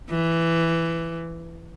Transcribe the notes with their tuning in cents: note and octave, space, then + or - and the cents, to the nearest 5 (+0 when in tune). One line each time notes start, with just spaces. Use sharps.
E3 +10